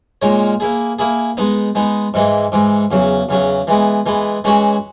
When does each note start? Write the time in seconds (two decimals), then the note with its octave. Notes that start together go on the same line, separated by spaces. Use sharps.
0.22 A#2 G#3 D#4 A#4 C#5
0.60 A#3 E4 G#4
0.99 A#3 E4 G#4
1.37 G#3 B3 D#4
1.75 G#3 B3 D#4
2.14 G#2 E3 G#3
2.52 G#2 E3 G#3
2.91 E2 C#3 F#3
3.29 E2 C#3 F#3
3.67 E3 G#3 B3
4.06 E3 G#3 B3
4.44 E3 G#3 C#4 F#4 C#5